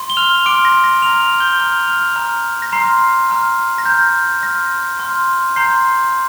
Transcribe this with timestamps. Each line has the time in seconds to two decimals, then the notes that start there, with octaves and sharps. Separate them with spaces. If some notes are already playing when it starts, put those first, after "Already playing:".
Already playing: C6
0.10 G7
0.17 F6 F7
0.46 C6 D6 F6 D7
0.65 A#6
0.84 A#6
1.02 A#5 F6 F7
1.21 F6 F7
1.40 G6 G7
1.59 A#5 F6 F7
1.87 F6 F7
2.16 A#5 F6
2.62 A#6
2.73 A#5 C6 F6 C7
3.30 A#5 F6
3.78 A#6
3.85 A#5 F6 G6
4.43 C6 F6 A#6
4.99 C6 F6
5.56 A#5 C6 G6 C7